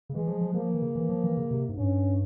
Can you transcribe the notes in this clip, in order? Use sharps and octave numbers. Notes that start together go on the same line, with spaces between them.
C#3
E3 G#3
F3
F3
F3 A#3
E3
C#3
E3
F3
E3
C#3
C3
G#2
G2 C#4